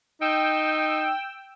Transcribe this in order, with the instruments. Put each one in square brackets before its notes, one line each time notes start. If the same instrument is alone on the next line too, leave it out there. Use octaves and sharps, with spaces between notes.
[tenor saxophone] D#4 [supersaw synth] G5 E6